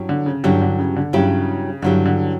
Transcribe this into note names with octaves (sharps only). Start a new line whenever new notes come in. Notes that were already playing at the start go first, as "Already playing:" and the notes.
Already playing: G2 F#3 C#4 E4 G4
D3
C#3
G2 D3 F#3 C#4 E4 G4
D3
C#3
D3
G2 C#3 F#3 C#4 E4 G4
G2 D3 F#3 C#4 E4 G4
D3